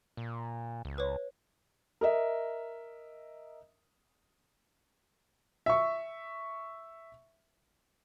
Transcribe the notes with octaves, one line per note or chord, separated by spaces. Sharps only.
A#2
C#2
B4 C#5
A#4 D#5 E5
E5 C#6